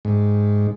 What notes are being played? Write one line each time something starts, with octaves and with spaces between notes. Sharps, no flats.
G#2